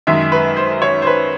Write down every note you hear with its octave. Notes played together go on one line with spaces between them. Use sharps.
F#2 D#3 G#3 E5
B4
C5
C#5
C5
B4